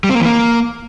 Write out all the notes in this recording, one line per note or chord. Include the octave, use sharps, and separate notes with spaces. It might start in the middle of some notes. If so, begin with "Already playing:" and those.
G3
C4
A#3
E3
A#3